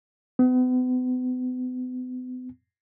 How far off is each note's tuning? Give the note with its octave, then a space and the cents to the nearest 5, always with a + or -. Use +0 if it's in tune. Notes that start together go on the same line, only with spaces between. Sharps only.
B3 +40